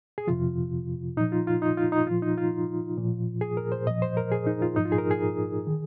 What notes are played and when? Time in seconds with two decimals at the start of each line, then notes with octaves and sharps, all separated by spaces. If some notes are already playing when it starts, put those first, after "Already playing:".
0.18 G#4
0.27 F2 C3 F3 F4
1.17 A#2 F3 D#4
1.32 F4
1.47 F4
1.62 D#4
1.77 F4
1.92 D#4
2.07 A#2 F3 F4
2.22 D#4
2.38 F4
2.97 A#2 F3
3.41 G#4
3.57 A#4
3.72 C5
3.86 A#2 F3 D#5
4.02 C5
4.17 A#4
4.32 G#4
4.47 D#4
4.62 F4
4.76 G#2 F3 D#4
4.85 F4
4.92 G#4
4.98 A#4
5.11 G#4
5.67 D#3